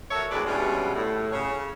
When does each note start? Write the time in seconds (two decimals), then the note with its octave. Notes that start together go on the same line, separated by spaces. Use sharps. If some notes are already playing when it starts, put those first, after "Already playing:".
0.11 F#4 A4 A#4 C#5 E5
0.30 D2 B2 E3 G#3 B4 D5
0.46 G2 B2 G3 G#3 C#4 E4
0.95 A2
1.32 C#3 C#5